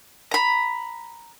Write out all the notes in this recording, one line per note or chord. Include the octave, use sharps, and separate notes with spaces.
A#5 B5